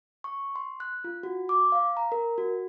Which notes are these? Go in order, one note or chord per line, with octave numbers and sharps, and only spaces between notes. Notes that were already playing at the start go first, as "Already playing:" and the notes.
C#6
C6
F#6
F4
F#4
D6
F5
A#5
A#4
F#4